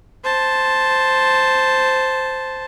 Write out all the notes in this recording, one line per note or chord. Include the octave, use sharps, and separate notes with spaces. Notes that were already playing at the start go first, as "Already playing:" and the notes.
C5 A5